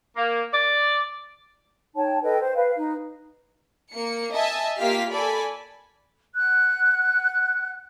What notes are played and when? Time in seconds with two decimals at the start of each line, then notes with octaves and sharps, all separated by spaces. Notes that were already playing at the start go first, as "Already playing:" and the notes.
0.17 A#3
0.53 D5
1.96 D#4 C#5 G5 A5
2.23 A4 B4 D#5 G5
2.38 C5
2.55 B4 F5
2.75 D#4 B4
3.94 A#3 C#7
4.35 D#5 E5 G#5 A5
4.77 A#3 F4 G4 F5 F6 B6
5.10 A4 D5 G#5 B5
6.35 F#5 F#6